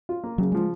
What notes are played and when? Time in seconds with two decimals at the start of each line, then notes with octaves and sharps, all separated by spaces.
0.09 F4
0.24 A#3
0.38 C#3 F#3
0.52 F3 G#3